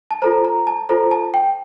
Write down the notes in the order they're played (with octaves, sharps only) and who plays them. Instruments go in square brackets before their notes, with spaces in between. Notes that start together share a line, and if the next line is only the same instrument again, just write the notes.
[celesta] A5
F4 A4 C5 A#5
A#5
A5
F4 A4 C5 A#5
A5
G5